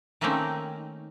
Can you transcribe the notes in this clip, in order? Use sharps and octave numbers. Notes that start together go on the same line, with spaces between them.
D#3 A3 A#3 C4 C#4 D#4